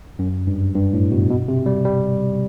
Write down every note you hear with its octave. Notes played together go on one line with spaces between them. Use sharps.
F#2
G2
G2
A2
B2
B2
C3
G3
G3